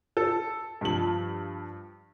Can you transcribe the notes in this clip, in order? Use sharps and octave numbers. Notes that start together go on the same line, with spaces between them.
A4
G2 F3 F#7